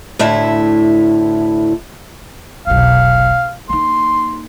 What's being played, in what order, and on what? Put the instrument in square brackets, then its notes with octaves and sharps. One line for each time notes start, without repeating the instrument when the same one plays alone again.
[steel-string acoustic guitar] D2 A2 E4 E5
[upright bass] F1 B1 [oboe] F5
[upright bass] A#3 D#4 [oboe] C6